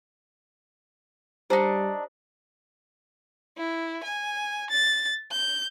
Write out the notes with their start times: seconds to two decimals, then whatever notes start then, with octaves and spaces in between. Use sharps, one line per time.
1.50 G3 D4 D#4 G4 C5 A#5
3.57 E4
4.04 G#5
4.70 A6
5.32 G6